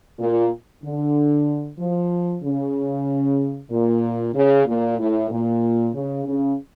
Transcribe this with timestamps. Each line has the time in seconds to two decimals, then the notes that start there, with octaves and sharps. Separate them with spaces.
0.19 A#2
0.84 D3
1.79 F3
2.44 C#3
3.71 A#2
4.34 C#3
4.67 A#2
4.98 A2
5.31 A#2
5.94 C#3
6.26 C#3